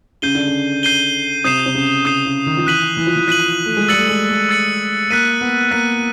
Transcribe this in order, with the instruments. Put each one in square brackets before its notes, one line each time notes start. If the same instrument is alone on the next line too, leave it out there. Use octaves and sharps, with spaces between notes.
[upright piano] C#3 [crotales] G6 C7 D#7 G7
[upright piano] D3
C#3
[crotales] G6 C7 D#7 G7
[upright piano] C3 [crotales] D#6 G6 C7 E7
[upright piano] C3
C#3
[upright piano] C#3 [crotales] D#6 G6 C7 E7
[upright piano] C#3
D#3
F3
[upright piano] E3 [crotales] F#6 B6 D#7 F#7
[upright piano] E3
F3
E3
[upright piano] F3 [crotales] F#6 B6 D#7 F#7
[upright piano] A3
G#3
[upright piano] G3 [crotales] E6 A6 C#7 F#7
[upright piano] A3
G#3
A3
[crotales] E6 A6 C#7 F#7
[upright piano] A#3 [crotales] F#6 B6 D#7
[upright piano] B3
[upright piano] A#3 [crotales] F#6 B6 D#7